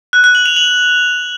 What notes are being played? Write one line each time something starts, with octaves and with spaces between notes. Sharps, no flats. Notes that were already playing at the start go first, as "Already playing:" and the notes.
F#6
F#6
F#7
F7
F#7